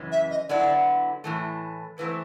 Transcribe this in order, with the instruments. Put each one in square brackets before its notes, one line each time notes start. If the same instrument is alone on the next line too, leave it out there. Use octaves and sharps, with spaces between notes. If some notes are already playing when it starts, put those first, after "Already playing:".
Already playing: [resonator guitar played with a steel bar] F#2 C#3 E3 G#3 C#4
[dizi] E5
D#5
[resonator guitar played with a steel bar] D3 F#3 B3 E4 [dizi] D5
[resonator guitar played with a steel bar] A2 E3 A3
[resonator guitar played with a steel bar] G#2 E3 A3 C4 [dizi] B4